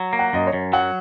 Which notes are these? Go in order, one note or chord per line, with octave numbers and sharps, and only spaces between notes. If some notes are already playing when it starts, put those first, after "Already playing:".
Already playing: F#3
A#3
F#5
F#2 D#5
C#5
F#2
F#3 F#5